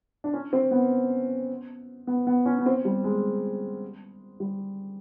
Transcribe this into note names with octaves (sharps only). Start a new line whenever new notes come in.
D4
C#4
C4
B3
B3
B3
C#4
B3
C4
G3
G#3
G3